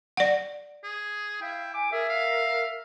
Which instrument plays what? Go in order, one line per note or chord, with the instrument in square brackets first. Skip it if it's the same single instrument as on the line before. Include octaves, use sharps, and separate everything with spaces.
[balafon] D5 F#5
[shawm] G#4
[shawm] E4 [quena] F5 [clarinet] G5
[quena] G#5 [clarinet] D6
[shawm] G#4 [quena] A#4 [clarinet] E5
[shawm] F5